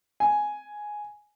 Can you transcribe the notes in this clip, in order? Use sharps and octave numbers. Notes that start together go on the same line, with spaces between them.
G#5